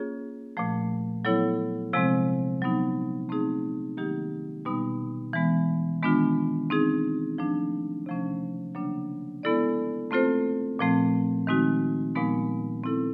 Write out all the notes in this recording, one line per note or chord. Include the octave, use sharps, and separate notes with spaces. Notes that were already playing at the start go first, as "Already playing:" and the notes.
Already playing: A#3 C#4 F4 G#4 C#5
A#2 F3 A3
F#3 B3 E4 A4 C#5
C3 F3 G#3 C4
F#3 B3 D#4
A3 C4 D#4 G#4
D#3 F#3 A#3 D#4 G4
B2 G3 B3 D#4
E3 G#3 B3
D#3 G#3 B3 D4 F4
C4 D#4 G#4
F3 A3 D4
C3 F3 A3 C#4
C#3 F#3 A#3 D4
G#3 B3 E4 A4 D5
A3 C4 F4 A4 C5
A#2 F3 A3 C4
D#3 G#3 C4 D#4 F#4
A#2 F3 G#3 B3 D#4
C4 E4 A4